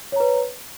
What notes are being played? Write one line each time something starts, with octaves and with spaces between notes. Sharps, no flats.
B4 C#5 A#5